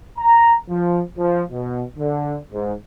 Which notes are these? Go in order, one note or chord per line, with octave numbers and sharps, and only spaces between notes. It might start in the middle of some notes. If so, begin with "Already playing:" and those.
A#5
F3
F3
B2
D3
G#2